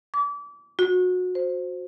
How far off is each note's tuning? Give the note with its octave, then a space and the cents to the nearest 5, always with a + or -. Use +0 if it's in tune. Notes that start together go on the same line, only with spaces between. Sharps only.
D6 -30
F#4 -25
C5 +0